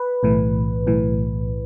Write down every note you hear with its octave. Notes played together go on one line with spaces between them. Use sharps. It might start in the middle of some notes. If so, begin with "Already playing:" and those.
Already playing: B4
B1 A2 E3
B1 A2 E3